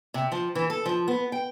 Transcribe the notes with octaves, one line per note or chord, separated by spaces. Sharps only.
C3
F3
E3
A4
F3
B3
G5